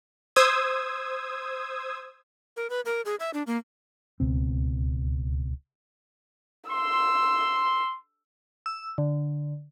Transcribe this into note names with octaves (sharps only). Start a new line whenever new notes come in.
C5 D#6 E6 G#6
A#4
B4
A#4
G#4
E5
D4
A#3
D1 C#2 B2 C4
C6 E6
E6
D3